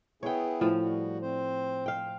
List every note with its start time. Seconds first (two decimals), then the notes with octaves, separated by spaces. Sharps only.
0.23 B3 E4 G#4 C#5 G5
0.61 A2 F3
0.81 G3 F#4
1.22 C4 C5
1.86 F5 G5